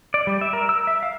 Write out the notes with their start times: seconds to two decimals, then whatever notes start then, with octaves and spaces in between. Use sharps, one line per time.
0.14 D5
0.27 G3
0.41 E5
0.53 A#4
0.69 E6
0.87 E5
1.03 F5